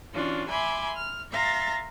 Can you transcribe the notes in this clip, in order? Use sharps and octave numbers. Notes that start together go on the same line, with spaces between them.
E3 C#4 D4 F4 F#4
E5 G#5 B5 C6 D6
F6
E5 F5 A#5 C6 A6 A#6